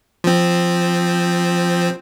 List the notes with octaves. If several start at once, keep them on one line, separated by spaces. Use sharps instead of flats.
F3 C4